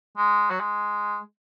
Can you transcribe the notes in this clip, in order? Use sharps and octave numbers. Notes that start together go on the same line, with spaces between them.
G#3
F#3
G#3